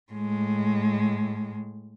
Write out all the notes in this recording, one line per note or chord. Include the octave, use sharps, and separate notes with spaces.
A2 G#3